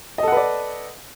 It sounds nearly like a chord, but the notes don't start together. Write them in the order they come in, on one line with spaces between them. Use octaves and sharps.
D#5 A4 F#5 B4 D5